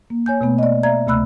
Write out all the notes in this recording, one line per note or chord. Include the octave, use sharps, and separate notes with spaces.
A#3
C#5 G#5 G6
B2 A3 B3
D5 D#5
D5 E5 A#5 G#6
D2 C3 A3 B5 E6 F#6